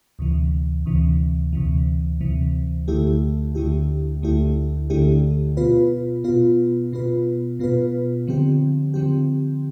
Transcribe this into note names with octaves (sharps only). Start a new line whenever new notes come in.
D2 C3 E3
D2 C3 E3
D2 C3 E3
D2 C3 E3
D2 D3 A3 E4 G4
D2 D3 A3 E4 G4
D2 D3 A3 E4 G4
D2 D3 A3 E4 G4
B2 B3 F4 B4
B2 B3 F4 B4
B2 B3 F4 B4
B2 B3 F4 B4
D3 F3 C4 G4
D3 F3 C4 G4